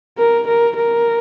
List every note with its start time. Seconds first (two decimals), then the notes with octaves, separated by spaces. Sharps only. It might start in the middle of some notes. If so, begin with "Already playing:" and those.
0.18 A#4
0.48 A#4
0.76 A#4